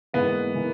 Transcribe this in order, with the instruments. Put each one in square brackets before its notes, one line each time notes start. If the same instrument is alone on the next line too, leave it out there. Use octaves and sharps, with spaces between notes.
[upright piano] G#2 E3 A#3 [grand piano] B3
[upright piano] E3 A#3